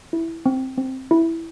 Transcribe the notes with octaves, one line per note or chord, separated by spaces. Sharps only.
E4
C4
C4
E4